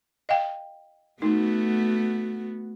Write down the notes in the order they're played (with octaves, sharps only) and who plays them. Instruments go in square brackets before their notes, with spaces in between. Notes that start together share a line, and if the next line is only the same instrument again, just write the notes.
[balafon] D#5 F5 G5
[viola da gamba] A3 B3 F#4 [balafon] D#4